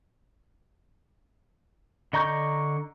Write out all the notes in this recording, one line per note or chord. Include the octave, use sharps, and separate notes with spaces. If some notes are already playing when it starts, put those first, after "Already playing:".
D3 D#5 A#5 C#6 G6